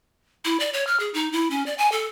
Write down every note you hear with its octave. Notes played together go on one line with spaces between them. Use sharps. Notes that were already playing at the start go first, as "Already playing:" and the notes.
E4
D5
C#5
F6
G#4
D#4
E4
C#4
D5
G#5
A4